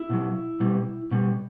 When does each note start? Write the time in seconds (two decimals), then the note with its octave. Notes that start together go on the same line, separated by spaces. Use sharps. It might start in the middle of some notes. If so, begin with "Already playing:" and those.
Already playing: E4
0.10 B2 F#3
0.60 B2 G3
1.11 B2 G3